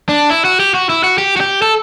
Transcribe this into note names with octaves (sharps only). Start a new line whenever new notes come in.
D4
E4
F#4
G4
F#4
E4
F#4
G4
F#4
G4
A4